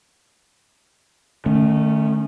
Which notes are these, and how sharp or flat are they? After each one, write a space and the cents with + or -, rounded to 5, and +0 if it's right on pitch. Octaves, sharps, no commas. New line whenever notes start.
D#3 -35 A3 +0 C#4 +0